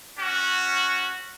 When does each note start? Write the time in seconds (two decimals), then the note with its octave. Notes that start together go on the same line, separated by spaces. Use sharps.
0.19 C#4 F#4